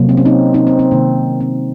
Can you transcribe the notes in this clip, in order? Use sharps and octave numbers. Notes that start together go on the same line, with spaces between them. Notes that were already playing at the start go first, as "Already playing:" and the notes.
Already playing: C3 F#3 A#3
C4
C#4
C4 D#4
C4 D#4
C4
C4
C3 D#3 A#3
C4